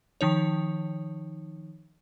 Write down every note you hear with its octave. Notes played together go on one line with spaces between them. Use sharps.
D#3 F3 D#4 C#5